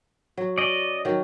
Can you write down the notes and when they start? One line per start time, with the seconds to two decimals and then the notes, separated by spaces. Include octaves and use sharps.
0.37 F#3
0.58 C#4 D5 D#5
1.05 D#3 F#3